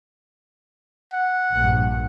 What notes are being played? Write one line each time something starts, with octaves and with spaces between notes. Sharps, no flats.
F#5
A#1 G2 A#2